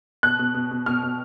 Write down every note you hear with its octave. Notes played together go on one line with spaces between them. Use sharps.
B2 F#6
B2
B2
B2
B2 F6
B2